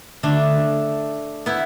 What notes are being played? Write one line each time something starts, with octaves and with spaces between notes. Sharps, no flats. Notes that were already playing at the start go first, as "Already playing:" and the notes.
D3 A3 D4
B3 E4